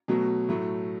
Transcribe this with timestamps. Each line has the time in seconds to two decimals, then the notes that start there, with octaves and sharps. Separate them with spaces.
0.08 B2 F#3 A3
0.49 A2 F#3 A3